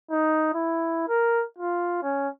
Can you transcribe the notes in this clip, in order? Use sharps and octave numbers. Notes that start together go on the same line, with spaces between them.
D#4
E4
A#4
F4
C#4